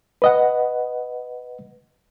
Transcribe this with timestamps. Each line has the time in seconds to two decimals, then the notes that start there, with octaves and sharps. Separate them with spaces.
0.22 B4 D#5 F#5